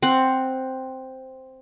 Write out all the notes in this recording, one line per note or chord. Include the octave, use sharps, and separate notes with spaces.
C4 F#5